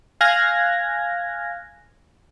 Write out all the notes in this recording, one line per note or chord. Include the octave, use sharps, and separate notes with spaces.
F5 G#5 F6 F#6 G#6 A#6